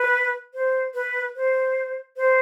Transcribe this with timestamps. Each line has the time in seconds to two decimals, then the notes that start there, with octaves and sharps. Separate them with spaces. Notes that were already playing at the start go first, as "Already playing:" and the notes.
Already playing: B4
0.54 C5
0.94 B4
1.36 C5
2.17 C5